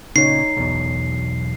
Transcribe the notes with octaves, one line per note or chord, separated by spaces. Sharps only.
A#2 C#3 D#4 C#5 C7
B1 E2 B2